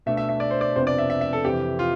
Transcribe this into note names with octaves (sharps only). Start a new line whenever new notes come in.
B2 A3 D4 E5
E5
E5
D5
C5
D5
F2 C3 F3 B3 D4 C5
D5
E5
E5
E5
A4
F2 C3 E3 G4
F4